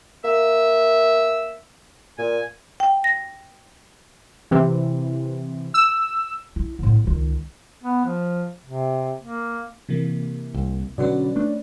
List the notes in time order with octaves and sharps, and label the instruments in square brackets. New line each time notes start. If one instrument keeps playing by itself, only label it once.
[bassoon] A#3 [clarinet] E5
[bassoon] A#2 [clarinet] G#5
[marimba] G5
A#6
[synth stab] C3 E3
E6
[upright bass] E4
A2 B3
C#2 D#3
[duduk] B3
F3
C3
A#3
[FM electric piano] C3 E3 A#3
[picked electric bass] C2
[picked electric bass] B2 D3 F#3 [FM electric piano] C#4 B4 D5
[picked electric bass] A3 D4